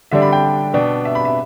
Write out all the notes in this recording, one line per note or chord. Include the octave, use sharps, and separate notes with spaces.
D3 G3 D4 E5
B5
G5
B2 B3 D4
E5
B5
E5